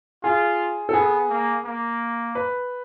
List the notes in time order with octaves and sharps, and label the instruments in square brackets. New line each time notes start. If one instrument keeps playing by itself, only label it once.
[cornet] F4 [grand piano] G#4
[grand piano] A4
[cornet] B3 [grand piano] G#4
[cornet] A#3
A#3
[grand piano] B4